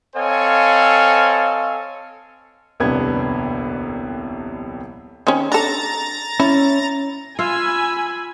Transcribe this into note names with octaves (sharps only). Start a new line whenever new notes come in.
C4 A4 C#5 D#5 F5 G#5
D#1 C2 F2 B3 D4 G#6
D#3 C4 C#4
D4 A4 A#5 A6
C#4 E4
F4 F5 G#5 B5 E6